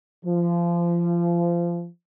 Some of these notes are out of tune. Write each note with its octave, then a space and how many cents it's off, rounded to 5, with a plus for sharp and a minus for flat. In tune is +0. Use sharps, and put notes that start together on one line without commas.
F3 -25